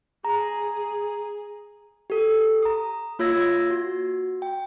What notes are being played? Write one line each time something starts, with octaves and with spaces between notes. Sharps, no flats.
G#4 A#5
G4 A4
A#5 D#6
A#3 F4 C#5 E6 G#6 A#6
F#4
G5